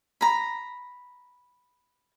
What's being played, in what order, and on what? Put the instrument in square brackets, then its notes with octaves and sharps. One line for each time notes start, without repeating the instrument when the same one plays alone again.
[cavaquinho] A#5 B5